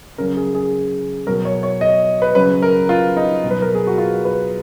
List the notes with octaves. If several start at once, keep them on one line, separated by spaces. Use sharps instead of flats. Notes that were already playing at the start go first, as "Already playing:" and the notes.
C#3 F#3 A#4
G#4
G#4
B2 F#3 A#4
C#5
C#5
D#5
B4
C#3 F#3 B4
A#4
F4
D#4
B2
F#3 B4
A#4
G#4
F#4
F4
B4